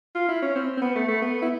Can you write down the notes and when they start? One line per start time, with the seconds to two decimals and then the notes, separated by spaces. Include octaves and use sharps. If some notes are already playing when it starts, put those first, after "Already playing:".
0.15 F4
0.29 E4
0.42 C#4
0.55 C4
0.77 C4
0.82 B3
0.96 A3
1.08 A3
1.22 B3
1.42 E4